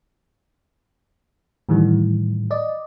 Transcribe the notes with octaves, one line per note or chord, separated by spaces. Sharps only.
A2 D#3 E3 G3
D5 D#5